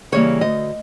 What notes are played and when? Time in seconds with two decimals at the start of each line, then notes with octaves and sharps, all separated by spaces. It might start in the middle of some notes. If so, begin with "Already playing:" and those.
0.12 C#3 E3 G3 A#3 C#5
0.41 D2 D#5